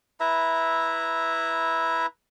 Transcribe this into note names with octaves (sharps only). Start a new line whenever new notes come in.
E4 B4 E5 A#5